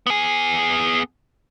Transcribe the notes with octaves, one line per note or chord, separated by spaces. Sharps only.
B3 G#4